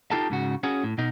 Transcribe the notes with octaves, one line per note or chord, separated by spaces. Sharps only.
D#4 F4 G4 A4 A5
G#2 C#3 F#4
C#4 F#4 G#4
A2
B2 D#4